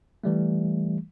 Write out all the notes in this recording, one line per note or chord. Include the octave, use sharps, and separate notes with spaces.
E3 G3 A3